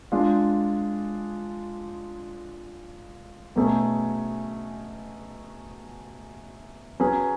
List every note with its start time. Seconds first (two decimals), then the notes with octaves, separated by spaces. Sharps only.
0.12 G#3 D4 F4
3.56 B2 F#3 A3 C#4 G#4
7.00 F#3 C#4 G#4 B4